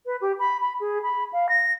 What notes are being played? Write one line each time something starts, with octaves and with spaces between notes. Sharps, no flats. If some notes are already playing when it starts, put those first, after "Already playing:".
B4
G4
B5
B5
G#4
B5
F5
A#6